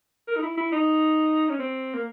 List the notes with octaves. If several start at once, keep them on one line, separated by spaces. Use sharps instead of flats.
A#4
D#4
E4
E4
D#4
C#4
C4
A#3